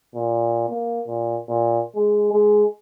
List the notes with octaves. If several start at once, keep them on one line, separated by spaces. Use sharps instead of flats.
A#2
A#3
A#2
A#2
G#3
G#3